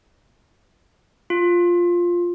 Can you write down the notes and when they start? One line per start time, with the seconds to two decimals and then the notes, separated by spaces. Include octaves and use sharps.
1.30 F4